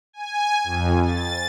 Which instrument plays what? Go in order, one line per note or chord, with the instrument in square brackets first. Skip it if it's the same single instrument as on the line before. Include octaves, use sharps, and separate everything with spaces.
[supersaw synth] G#5
F2
A6